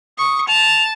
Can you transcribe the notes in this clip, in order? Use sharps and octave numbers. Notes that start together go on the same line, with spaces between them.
C#6 D#6
A5 F7